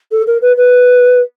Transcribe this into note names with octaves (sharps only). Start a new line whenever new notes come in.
A4
A#4
B4
B4